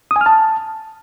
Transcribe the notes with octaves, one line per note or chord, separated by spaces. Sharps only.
D#6
G#5
F6
A5